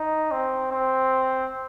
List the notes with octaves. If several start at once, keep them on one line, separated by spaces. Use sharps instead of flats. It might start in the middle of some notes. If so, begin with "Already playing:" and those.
Already playing: D#4
C4
C4